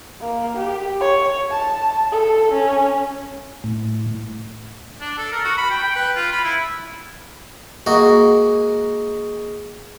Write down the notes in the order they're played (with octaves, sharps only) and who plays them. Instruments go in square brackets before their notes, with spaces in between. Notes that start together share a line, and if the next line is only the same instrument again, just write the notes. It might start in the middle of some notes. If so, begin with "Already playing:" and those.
[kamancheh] A#3
G4
C#5
A5
A4
C#4
[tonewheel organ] A2
[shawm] D4
A4
A#4
F#4
B5
G5
G5
B4
F4
B5
E4
[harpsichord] G#3 A#3 F#4